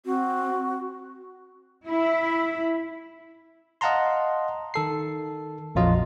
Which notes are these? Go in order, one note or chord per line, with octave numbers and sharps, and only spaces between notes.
C4 F#4
E4
D#5 F5 F#5 A5 A#5 C6
D#3 A4 C7
A#1 F2 F#3 F4 D#5